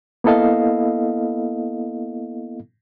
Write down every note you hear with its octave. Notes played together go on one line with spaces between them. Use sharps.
A#3 B3 E4 A4 D#5 F5